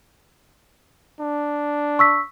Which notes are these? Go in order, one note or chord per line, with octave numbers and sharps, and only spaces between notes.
D4
C#6 E6 B6